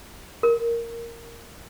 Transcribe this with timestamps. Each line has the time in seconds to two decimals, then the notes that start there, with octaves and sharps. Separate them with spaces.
0.43 A#4